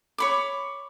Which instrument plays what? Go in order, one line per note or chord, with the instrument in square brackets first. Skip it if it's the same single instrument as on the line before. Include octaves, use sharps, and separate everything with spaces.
[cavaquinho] C#5 B5 D6